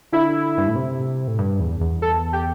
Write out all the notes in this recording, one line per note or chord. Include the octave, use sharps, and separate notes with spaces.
D3 E4
G2
A2
C3
A2
G2
E2
E2
A4
G4